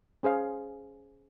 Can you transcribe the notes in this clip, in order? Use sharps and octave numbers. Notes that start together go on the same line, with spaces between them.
C#4 G#4 C5 F5